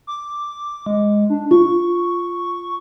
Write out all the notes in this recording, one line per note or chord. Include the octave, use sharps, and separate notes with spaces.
D6
G#3
D4
F4 C#6